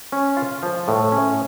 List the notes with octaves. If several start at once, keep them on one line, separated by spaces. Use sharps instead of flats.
C#4
F4
F3
A2
C#4